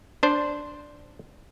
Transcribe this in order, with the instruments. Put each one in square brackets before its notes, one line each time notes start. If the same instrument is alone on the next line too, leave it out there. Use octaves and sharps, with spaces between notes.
[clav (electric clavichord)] D4 C5